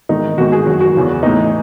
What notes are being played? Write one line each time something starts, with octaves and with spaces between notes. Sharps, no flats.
G#2 D#3 D#4
G#2 D#3 F#4
G#4
F#2 D#3 F#4
F#4
E2 C#3 E3
A2 E3 D#4